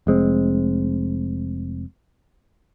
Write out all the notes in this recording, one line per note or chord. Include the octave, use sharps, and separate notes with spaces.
F1 G#3 C4